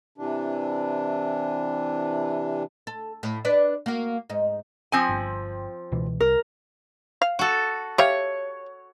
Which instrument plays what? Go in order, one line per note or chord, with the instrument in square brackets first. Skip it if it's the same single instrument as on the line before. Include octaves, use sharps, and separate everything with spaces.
[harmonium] C3 E3 D4
[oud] A4
A2
D4 B4 D5
A#3 F#4
G#2 D#4
[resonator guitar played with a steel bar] F3 C4 G#5
[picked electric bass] G1
C#2 B2 E3
[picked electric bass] C2 [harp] A#4
[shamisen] F5
[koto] F#4 A4
[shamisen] G4 E5 F5 [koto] C#5